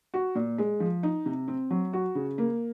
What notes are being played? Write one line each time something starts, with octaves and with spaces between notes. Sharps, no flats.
F#4
A#2
G#3
F3
D#4
C3
C4
F#3
F#4
C#3
A#3